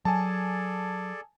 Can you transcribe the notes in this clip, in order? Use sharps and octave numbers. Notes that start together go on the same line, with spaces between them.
F#3 G#4 A4 D5 G#5 A5